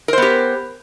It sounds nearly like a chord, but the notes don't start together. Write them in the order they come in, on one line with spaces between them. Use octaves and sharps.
A#4 C5 B3 G4